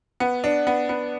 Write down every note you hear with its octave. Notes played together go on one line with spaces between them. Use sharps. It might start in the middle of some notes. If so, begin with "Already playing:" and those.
B3
D4
B3
B3